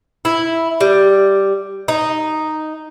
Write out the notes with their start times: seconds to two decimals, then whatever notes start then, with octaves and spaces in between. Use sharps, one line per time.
0.25 E4
0.81 G3
1.88 D#4